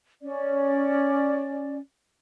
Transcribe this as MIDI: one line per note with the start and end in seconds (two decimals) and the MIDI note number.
0.23 1.78 61
0.23 1.78 74